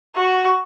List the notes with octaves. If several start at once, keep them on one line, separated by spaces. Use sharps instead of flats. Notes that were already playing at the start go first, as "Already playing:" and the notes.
F#4